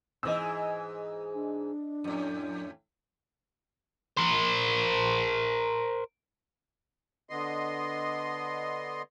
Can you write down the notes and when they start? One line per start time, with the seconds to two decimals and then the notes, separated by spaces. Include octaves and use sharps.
0.23 G#2 E3 D#5 E6
1.34 D4
2.04 F2 A2
4.17 A#4 C5
7.30 D3 B3 D#5 C6